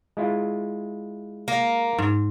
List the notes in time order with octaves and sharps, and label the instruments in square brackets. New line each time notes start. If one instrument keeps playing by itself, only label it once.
[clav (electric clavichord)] G#3 E4 F4
[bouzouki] A#3
[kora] G#2